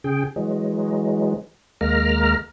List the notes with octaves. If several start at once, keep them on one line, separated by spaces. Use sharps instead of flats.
C#3 G#4 G5
E3 F#3 G#3
D#2 G#3 A#3 A#4 A#5 F6